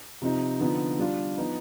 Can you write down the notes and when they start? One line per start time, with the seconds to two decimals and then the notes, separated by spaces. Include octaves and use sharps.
0.22 C3 F3 C4 D#4
0.60 D3 F3 B3 D#4
0.99 G3 D4 F4
1.37 F3 B3 D#4